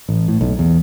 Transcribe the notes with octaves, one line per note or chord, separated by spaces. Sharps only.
A1
A2
B1
E2